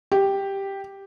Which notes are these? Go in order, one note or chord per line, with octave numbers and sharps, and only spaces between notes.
G4